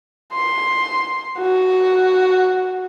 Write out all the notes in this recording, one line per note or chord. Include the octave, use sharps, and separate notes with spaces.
C6
F#4